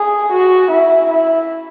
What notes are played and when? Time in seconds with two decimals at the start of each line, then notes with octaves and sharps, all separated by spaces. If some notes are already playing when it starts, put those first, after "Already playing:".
Already playing: G#4
0.32 F#4
0.71 E4
1.09 E4